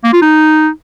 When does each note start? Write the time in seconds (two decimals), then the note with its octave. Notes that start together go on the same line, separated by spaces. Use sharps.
0.04 A#3
0.13 F4
0.22 D#4